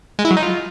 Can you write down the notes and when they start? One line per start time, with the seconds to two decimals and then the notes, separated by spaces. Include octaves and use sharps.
0.19 G#3
0.25 E4
0.31 F#3
0.37 D#4
0.43 F4